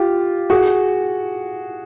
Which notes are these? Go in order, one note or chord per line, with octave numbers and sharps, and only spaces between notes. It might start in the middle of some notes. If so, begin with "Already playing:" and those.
Already playing: F4 G4
F#4 G#4